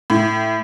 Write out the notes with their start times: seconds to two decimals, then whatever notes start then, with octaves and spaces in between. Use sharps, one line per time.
0.10 A2